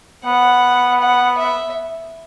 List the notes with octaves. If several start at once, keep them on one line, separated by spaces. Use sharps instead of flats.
B3 F#5
F#5
E5